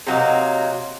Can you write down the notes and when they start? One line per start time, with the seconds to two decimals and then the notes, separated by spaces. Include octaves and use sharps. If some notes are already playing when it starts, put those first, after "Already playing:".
0.07 C3 F#3 A#3 D#4